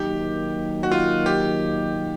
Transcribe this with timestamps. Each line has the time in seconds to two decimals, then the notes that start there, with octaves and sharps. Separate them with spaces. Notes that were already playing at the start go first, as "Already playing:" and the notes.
Already playing: D#3 F#3 A#3 D#4 G4
0.83 F#4
0.92 F4
1.26 G4